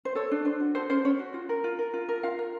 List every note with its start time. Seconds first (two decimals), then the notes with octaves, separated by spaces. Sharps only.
0.05 C5
0.15 A4 C#5
0.31 D4
0.45 D4 C5
0.60 F#4
0.75 A4 C5
0.90 C#4 C5
1.05 C#4 C#5
1.19 F#4
1.34 F4
1.49 A#4
1.64 F4
1.79 A#4
1.94 F4
2.09 A#4
2.23 F4 F5
2.39 A#4